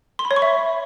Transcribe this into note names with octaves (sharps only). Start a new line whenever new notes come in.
C6
B5
C#5
C#6
E5